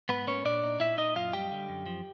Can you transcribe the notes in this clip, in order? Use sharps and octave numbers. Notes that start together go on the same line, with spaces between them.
G#2 B3 B4
A#3 C#4 C#5
A#2 D4 D5
D#4
A#2 E4 E5
A#2 D#4 D#5
F#2 F4 F5
G3 G4 G5
D3
F#2
F3